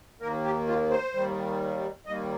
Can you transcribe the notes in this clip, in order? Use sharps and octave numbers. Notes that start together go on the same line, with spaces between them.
D#2 D#3 A#3 A#4
G4
F4
C5
D#2 D#3 G3
D#2 D#3 G3 A#3 D#5